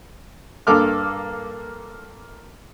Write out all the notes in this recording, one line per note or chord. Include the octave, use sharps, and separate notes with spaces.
G2 A#3 A4 D6 F6